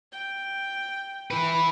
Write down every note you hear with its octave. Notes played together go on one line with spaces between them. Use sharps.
G5
E4 B4